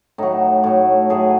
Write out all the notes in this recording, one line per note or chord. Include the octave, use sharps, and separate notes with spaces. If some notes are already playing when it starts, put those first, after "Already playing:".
A2 F#3 D#4
A2 F#3
A2 F#3 G#4